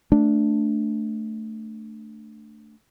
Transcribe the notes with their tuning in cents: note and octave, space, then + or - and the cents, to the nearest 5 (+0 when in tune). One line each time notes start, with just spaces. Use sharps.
A3 +5 D4 -5